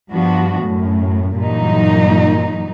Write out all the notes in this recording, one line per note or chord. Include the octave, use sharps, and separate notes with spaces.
G2 F3 B3 D4 F#4
F#2 A2
G2 A#2 E3 F#3 D#4